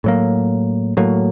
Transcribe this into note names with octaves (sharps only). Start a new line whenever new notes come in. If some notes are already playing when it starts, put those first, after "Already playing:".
A2 F#3 A#3
A2 F#3 A#3